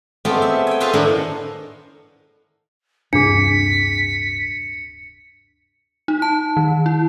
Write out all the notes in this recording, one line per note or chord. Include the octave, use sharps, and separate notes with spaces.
A3 B3 C4 F4 G4 G#4
E5
G5 G#5
F4 G#4 B4 C5 E5 F5
A2 D#3 A#3 D4 E4 F#5
D1 G2 C3 D4 G#4 B6 C#7
D#4
A5
D#3
E4